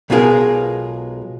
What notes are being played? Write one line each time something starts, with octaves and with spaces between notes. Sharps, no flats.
B1 B2 G#3 F4 G#4 A#4